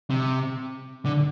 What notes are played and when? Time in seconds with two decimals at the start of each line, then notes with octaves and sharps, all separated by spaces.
0.10 C3
1.05 D3